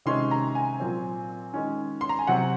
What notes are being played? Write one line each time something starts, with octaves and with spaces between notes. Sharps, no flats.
C3 D#3 G#3 C#4 C6
A#5
G#5
A#2 F#3 C4
D#3 G#3 C#4
C6
A#5
G#5
C3 F#3 C4 F#5